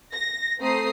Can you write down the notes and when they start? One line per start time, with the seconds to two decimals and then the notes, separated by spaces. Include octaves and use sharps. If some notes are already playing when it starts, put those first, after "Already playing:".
0.12 A#6
0.59 A3 C4 C5 A#5 D#6 C7